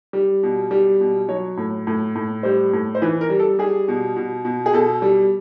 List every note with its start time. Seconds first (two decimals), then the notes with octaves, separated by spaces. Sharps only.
0.13 G3
0.43 B2
0.71 G3
1.00 B2
1.28 F#3 C#5
1.57 A2
1.87 A2
2.15 A2
2.43 G3 C5
2.73 A2
2.95 C5
3.02 E3 B4
3.21 A#4
3.29 G3
3.40 A4
3.59 G3 G#4
3.88 B2
4.16 B2
4.45 B2
4.66 G#4
4.73 B2 A4
5.02 G3